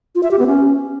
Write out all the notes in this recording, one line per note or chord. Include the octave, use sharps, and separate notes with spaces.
F4
E5
G4
B3
C#4